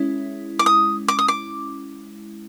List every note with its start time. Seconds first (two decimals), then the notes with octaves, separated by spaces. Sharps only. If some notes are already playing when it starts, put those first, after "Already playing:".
Already playing: G#3 C#4 E4
0.59 D6
0.66 D#6
1.08 D6
1.19 D#6
1.28 D6